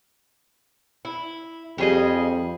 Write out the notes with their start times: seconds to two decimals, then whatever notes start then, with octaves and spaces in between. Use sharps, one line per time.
1.05 E4
1.78 F2 G3 G#4 D#5